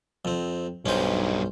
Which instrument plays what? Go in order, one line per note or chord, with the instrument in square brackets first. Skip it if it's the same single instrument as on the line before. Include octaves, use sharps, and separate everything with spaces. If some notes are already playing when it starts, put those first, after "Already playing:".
[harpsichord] F2 C4
[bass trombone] B1 [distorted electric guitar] G2 D#4 [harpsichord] C#4 C5